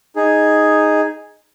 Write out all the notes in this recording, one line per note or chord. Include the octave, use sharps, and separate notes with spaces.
D#4 G#4